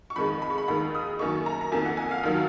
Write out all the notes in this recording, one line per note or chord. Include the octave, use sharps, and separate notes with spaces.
C#6
F2 D#3 G#3 B5
B5
C#6
B5
D#2 D#3 G#3 B5
D#6
F#2 D#3 A#3 C#6
A#5
A#5
F2 D#3 A#3 G#5
F#5
G#5
F5
D#2 D#3 F#3